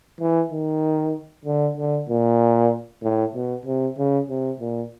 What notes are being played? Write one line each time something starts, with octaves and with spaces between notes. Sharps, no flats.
E3
D#3
D3
D3
A#2
A2
B2
C3
C#3
C3
A#2